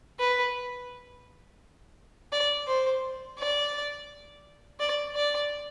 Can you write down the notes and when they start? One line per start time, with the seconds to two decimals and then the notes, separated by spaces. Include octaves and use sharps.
0.19 B4
2.32 D5
2.67 C5
3.38 D5
4.80 D5
5.15 D5